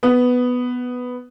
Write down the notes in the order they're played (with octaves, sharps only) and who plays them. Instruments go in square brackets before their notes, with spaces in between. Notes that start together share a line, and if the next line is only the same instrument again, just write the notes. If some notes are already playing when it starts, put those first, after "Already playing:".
[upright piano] B3